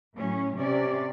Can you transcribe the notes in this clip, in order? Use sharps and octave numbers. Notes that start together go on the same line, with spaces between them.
A2 F#3 C#4
C3 C#4 D5